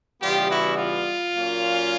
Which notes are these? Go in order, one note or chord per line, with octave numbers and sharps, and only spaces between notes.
C#3 E3 G3 B3 F4 G4
E4 F#4
F4
A#2 F#3 A#3 C#4